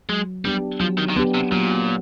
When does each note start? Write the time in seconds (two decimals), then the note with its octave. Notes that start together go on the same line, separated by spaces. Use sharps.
0.09 F#3 G#3
0.44 G3 B3 D4 G4
0.80 F3 F#3
0.98 D#3
1.09 D#3
1.16 D3 B3 D4 G4
1.34 C3
1.52 A#2 F#3